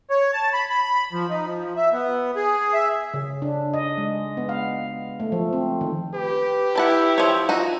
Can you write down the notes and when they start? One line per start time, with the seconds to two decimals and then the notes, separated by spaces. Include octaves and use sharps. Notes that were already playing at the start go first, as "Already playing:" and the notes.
0.10 C#5
0.33 A5
0.53 B5
0.70 B5
1.13 F3
1.30 D#4
1.46 F3
1.76 E5
1.92 B3
2.36 G#4
2.73 E5
3.14 C#3
3.42 D4
3.74 D#5
3.98 G#3
4.37 B3
4.49 F5
5.20 A3
5.32 F3
5.53 C4
5.81 D#3
6.15 G4 B4
6.76 E4 F#5 A5 B5
7.18 F3 C#5
7.49 D#4 F4 F#4